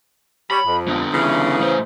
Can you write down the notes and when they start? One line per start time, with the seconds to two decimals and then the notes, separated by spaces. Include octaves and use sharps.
0.51 G3 C#5 B5
0.67 F2
0.88 D3 B3
1.13 C#3 E3
1.60 A2 C5